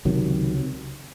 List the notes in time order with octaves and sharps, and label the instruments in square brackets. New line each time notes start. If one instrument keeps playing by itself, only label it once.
[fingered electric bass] C#2 C3 D#3 F#3